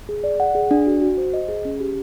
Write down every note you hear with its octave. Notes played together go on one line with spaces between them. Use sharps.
G#4
D5
F#5
G#4
D4
F#4
F#4
C5
D#5
G#4
C#4
G4